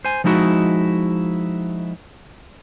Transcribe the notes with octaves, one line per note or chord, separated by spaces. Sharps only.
C5 G#5
F3 G#3 D#4 E4 F#4